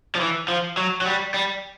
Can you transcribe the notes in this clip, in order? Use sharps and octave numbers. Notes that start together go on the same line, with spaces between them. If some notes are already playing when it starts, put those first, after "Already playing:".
F3
E3
F3
F#3
F#3
G3
G3